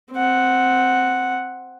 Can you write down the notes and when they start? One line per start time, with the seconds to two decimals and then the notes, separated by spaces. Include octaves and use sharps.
0.12 C4 F#5